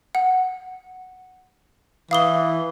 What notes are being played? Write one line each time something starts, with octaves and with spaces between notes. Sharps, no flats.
F#5
E3 F5 D#6 G7